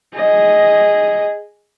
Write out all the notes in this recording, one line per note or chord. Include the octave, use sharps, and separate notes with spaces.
G#4 D#5